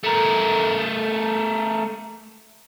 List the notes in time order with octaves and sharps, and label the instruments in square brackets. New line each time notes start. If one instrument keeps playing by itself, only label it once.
[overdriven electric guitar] A3 A#4